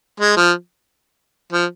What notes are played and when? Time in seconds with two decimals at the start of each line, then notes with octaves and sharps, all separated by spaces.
0.20 G#3
0.37 F3
1.53 F3